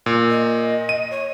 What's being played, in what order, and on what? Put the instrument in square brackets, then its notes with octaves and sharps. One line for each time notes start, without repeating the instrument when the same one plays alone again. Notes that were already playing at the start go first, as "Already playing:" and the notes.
[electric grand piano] A#2
[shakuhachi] D#5
[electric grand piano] D#7
[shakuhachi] C#5